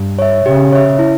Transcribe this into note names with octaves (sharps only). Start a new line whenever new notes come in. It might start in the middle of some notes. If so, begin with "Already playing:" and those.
Already playing: G2
C#5 E5
C#3 G4
C#5 E5
E4